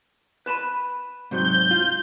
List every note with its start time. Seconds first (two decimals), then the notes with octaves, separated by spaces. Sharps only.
0.46 B4 A5 B5
1.31 G#2 C3 F#3 G6
1.71 F4